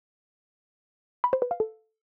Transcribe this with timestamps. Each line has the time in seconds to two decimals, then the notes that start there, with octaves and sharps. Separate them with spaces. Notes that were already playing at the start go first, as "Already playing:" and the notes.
1.24 B5
1.33 C5
1.42 B4
1.51 F5
1.60 A4